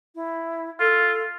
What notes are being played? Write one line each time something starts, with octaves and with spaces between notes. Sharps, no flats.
E4
F4 A4